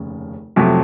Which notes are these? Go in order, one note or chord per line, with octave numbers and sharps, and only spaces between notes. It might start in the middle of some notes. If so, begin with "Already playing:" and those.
Already playing: F1 D#2 C#3
F2 C3 F#3 A3